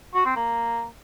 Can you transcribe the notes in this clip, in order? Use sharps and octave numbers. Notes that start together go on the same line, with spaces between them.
F#4
C4
A#3